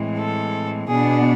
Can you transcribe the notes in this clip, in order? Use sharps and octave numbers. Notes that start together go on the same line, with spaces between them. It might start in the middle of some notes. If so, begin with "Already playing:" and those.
Already playing: A2 E3 G#3 C4
A4
B2 B3 D4 G#4